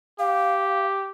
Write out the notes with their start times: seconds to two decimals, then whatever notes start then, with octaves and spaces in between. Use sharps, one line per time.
0.19 G4 F5